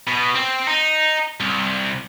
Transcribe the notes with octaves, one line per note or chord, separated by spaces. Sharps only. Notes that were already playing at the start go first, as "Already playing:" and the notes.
B2
C4
D#4
C2